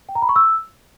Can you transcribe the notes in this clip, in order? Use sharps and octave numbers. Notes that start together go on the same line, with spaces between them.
G5
A#5
B5
C#6
E6